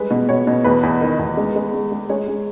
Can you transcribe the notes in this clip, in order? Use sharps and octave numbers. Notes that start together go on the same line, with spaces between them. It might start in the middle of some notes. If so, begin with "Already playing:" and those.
Already playing: G3 G#3 B4
B2
B2 C#5
B2
E2 B4
E2
D#3
E2
G#3
G#3
G#3
G#3
G#3 C#5
G#3